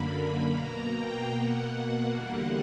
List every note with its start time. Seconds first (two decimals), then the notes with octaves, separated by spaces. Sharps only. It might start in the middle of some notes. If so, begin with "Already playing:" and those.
Already playing: F#2 D3 A#3 B5
0.48 B2 A#3 A#5
0.90 G5
1.31 B2 A#3 F#5
2.13 E2 D3 G3 A#3 F#5